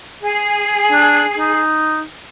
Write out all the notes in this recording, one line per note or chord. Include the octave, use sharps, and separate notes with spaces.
G#4
D4
D#4